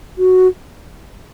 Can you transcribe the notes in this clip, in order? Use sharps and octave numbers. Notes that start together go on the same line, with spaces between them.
F#4